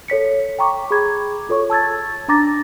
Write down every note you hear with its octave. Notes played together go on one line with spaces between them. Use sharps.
A4 C#5 B6 C#7
G5 A#5 C#6 D6
G#4 B5 D6 G#6
F4 A4 C#5 C#6
A5 E6 G#6 A6
D4 A#5 D6 A6 A#6